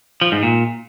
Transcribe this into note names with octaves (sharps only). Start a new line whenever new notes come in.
F3
G#2
A#2